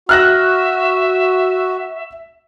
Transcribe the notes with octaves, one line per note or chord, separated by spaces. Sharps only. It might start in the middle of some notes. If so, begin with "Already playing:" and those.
F#4 E5 F6 F#6 A#6